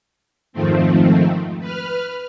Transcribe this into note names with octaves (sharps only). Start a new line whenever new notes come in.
F2 G#2 D#3 F3 A3 C4
B4 F6